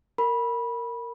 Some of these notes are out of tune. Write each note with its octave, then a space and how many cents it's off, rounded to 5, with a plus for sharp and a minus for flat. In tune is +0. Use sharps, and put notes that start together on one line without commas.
A#4 -15 B5 -20